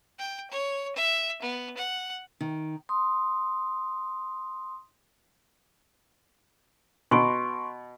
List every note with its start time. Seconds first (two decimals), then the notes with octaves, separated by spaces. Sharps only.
0.19 G5
0.51 C#5
0.96 E5
1.42 B3
1.77 F#5
2.41 D#3
2.89 C6 D#6
7.11 B2 C6 C#6 D7